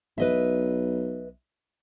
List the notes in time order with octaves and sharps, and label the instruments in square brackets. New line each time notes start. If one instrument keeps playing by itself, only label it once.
[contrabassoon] B1 [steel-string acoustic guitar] B4 D#5 E5